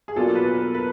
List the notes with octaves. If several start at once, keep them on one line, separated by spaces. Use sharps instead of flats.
G#4
B2 F#3 A#3 D4 F4 A4
B4
A#4
B4